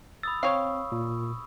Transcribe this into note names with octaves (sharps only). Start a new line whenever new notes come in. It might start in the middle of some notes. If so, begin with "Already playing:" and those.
B5 D#6 E6 A6
C4 C#5 F5 C#6 D#6
A#2